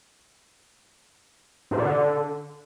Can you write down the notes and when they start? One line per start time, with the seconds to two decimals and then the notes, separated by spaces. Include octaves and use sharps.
1.71 G#2
1.78 A#2
1.85 D3